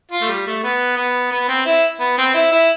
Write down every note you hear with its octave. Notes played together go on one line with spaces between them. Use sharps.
F4
A3
G3
A3
B3
B3
B3
C4
E4
B3
C4
E4
E4